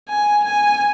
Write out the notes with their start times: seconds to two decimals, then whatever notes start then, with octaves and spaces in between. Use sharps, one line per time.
0.09 G#5
0.44 G#5